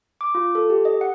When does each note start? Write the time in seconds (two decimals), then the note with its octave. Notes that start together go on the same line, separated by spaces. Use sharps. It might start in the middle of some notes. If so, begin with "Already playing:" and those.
0.21 D6
0.35 F4
0.55 A4
0.70 G4
0.85 D#5
1.01 F#5